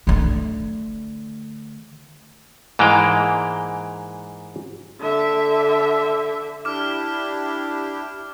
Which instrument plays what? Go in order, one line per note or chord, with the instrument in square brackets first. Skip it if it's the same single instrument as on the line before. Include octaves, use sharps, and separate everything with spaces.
[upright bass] D3 A3
[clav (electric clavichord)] G#2 E3 G#3 A#3 F5 G5
[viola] D3 E5
[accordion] D4 E4 G4 [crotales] D6 F6